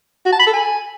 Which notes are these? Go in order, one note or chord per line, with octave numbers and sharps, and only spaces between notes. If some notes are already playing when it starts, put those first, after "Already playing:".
F#4
A5
B5
A4
G#5